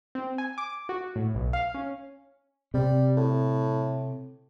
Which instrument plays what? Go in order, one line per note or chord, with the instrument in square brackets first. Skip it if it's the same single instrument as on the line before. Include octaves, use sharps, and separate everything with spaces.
[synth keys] C4
G#5
D6
F#4
A2
B1
F5
C#4
[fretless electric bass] C3 [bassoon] G3
[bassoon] A2